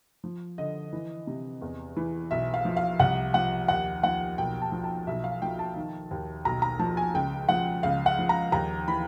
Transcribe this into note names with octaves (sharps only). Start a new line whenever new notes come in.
F3
D3 D#5
E3
C3
E2
E3
B1 E5
F5
F3
F5
C2 F#5
F3 F#5
D#2 F#5
F3 F#5
B1 G5
A5
F3
A5
B1 E5
F5
F3 G5
A5
D#3
D#2
B1 A#5
A#5
F3 A5
G#5
C#2 G5
F3 F#5
C#2 F5
F#5
F3
A#5
D#2 A#5
E3 B5